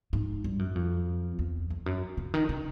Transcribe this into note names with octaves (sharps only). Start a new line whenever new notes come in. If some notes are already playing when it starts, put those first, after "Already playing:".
G#2
G2
F#2
F2
E2
F2
F#2
C#3
D#3
C#3